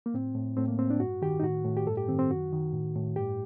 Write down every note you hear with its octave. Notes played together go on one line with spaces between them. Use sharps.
A#3
A2 C4
A2
A2 C4
A#3
A2 C4
D4
G2 F#4
D#3 G4
D#4
A2 F#4
A2
G4
G2 A4
G4
D#3 C4
C4
F#2 F#4
D#3
A2
A2
G2 G4